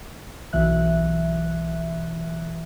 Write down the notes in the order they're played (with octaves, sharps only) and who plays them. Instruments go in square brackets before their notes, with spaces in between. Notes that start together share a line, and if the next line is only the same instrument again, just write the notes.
[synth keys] B1 B2 E3 E5 F#6